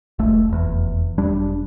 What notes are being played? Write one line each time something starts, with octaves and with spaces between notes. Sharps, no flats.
E1 B1 A3
F1 E2
E1 G3 D4